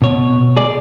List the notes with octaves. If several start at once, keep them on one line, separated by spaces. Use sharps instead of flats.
B2 C#5
G#4 D5